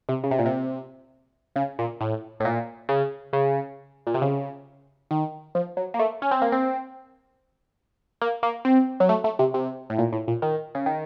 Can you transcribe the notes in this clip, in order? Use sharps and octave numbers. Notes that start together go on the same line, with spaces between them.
C3
C#3
C3
A#2
C3
C#3
A#2
A2
A2
A#2
C#3
C#3
A#2
C3
C#3
D#3
F3
F#3
A#3
A3
C#4
C4
A#3
C4
A#3
A#3
C4
F#3
A3
A3
C3
C3
A2
A#2
A2
A#2
D#3
C#3
D#3